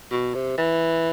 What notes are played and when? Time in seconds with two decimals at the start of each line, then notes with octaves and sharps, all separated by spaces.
0.11 B2
0.35 C3
0.58 E3